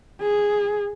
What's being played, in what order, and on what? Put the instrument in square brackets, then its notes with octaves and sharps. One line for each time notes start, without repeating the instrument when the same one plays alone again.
[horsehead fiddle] G#4